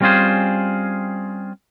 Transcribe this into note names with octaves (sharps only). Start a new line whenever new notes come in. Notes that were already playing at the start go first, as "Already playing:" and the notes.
G3 C4 C#4 F4 G#4 C5